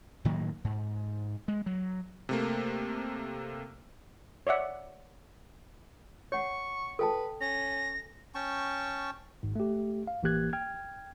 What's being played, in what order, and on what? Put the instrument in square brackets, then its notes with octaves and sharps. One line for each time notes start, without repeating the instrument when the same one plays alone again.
[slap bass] A2 D#3 F#3 A#3
G#2
G#3
F#3
[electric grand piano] C3 A3 A#3
[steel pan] C#5 D5 E5 F#5
[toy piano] C#5 F#5 [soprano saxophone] C#6
[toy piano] A4 G5 A5 [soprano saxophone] B4
[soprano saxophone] C#4 [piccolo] A#6
[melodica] C#4 G5 A5 C#6
[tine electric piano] G#1 G#2
A3 G4
F5
A1 E3 A#3 G4 F#6 G#6
G5 F6 G#6